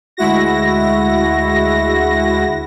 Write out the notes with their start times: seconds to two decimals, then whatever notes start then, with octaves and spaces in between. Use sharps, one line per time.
0.17 D2 G#3 E4 F#4 A#6